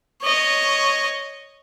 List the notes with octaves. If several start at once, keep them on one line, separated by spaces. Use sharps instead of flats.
C#5 D#5